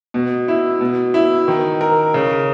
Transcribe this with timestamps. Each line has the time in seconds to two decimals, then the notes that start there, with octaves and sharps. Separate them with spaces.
0.14 B2
0.48 E4
0.81 B2
1.14 E4
1.48 D#3
1.81 A#4
2.14 C#3